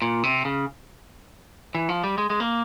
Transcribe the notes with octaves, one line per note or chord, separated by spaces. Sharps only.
A#2
C3
C#3
E3
F3
G3
G#3
G#3
A#3